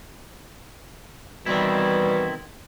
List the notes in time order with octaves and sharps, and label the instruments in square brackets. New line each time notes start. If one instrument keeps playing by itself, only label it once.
[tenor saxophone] B2 [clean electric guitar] D#3 C4 E4 [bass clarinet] E3 [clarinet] G3